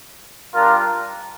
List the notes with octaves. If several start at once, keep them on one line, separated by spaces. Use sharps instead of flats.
G3 D4 F4 A#4